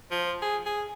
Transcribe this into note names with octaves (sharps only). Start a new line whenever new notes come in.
F3
G#4
G#4